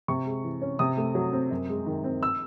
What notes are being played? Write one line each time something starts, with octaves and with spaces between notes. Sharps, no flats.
C3 C#6
G#3
E3
C#4
C3 D#6
A3
F#3
C4
F#2
G#3
D#3
C4
E6